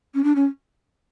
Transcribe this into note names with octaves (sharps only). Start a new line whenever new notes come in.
C#4
D4
C#4